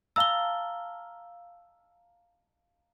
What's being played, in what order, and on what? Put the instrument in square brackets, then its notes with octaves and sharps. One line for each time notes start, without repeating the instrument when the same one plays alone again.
[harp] F5 A5 A#5 [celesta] E6 G7